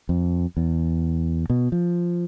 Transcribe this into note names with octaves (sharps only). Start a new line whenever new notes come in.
F2
E2
B2
F3